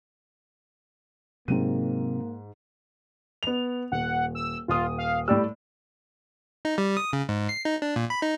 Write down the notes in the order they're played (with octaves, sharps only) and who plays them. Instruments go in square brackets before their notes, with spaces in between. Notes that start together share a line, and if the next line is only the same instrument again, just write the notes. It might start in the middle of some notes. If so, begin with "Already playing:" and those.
[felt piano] G#2 D#7 [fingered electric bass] C3 F#3 C4 [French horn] A#3
[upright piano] B3 F7
[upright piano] D#1 [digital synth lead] F#5
[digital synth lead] E6
[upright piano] D#1 D#6 [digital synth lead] F4
[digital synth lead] F5
[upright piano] A2 D5 E6 [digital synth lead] G3
[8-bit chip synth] D#4
G3
D#6
C#3
G#2
C7
D#4
D4
A#2
B5
D#4